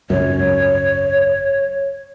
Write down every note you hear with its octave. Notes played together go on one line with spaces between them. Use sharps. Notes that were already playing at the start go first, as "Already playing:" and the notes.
G#1 C#2 F#2 C#5